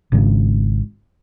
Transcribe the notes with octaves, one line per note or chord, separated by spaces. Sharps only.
G#1 G#2 C#3 G#3